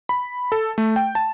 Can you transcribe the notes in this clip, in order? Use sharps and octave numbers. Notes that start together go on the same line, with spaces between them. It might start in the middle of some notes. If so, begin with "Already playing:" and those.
B5
A4
A3
G5
A5